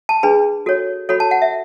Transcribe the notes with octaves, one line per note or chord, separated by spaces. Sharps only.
A5
D4 G#4 B4 B5
F#4 A4 C#5
F#4 A4 C#5 B5
A5
F#5
E5